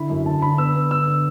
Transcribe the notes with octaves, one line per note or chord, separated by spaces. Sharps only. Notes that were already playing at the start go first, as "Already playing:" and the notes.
Already playing: D3 E4 B5
F#2
D3 A5
D3 B5
B3 E6
B3
D3 E6
D3